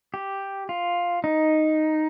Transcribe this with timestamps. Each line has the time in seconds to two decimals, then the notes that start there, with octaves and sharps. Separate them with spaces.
0.14 G4
0.69 F4
1.24 D#4